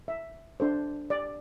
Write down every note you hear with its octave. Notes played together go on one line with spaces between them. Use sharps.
E5
D4 A4 C5
D5